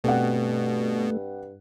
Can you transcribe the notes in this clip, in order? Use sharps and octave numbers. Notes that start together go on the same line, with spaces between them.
G2 B2 A3 C4 D5 F#5